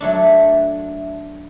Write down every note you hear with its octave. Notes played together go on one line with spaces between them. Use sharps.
F#3 A3 D4